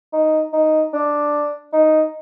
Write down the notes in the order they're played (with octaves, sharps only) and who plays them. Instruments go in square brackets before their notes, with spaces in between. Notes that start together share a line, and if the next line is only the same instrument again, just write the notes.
[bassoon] D#4
D#4
D4
D#4